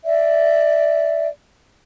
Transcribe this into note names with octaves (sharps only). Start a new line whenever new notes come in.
D5 E5